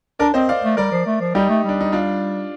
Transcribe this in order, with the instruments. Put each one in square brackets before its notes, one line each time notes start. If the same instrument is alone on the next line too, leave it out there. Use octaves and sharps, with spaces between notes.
[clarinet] D4 [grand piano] A#4 D5
[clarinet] C4 [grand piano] C5 D#5
[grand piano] D5 F5
[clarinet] A3
[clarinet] G3 [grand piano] A#4 D5
[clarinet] F3
A3
F3
[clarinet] G3 [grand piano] D#4 G4
[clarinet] A3
[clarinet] G3 [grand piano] D4
[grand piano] D#4
D4 F4